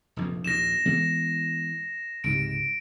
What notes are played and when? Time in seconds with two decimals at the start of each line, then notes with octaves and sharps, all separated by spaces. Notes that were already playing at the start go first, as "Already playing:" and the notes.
0.16 F1 A#1 F2
0.44 A#1 D#2 A#6 E7
0.86 E3 G#3 B3
2.24 C#2 G#2 C3 D7